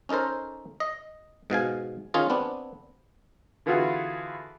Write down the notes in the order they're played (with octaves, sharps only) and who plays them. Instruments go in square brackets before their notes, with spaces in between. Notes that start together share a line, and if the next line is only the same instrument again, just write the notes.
[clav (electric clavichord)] C#4 D#4 A4 A#4 C5
D#5
G#2 B2 F5 G#5
D#3 C#4 F4 G#4
B3 C4 D4
[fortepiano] D3 E3 B3 F4 F#4 G#4